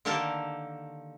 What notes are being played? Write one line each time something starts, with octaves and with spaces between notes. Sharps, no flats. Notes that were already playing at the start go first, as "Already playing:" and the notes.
D3 D#3 A#3 G4 A4 A#4